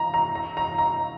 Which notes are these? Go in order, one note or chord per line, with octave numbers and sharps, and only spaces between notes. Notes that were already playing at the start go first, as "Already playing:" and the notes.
Already playing: A#5
A#5
A#5
A#5
A#5